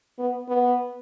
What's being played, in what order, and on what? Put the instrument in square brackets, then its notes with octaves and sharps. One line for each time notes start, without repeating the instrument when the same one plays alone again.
[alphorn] B3
B3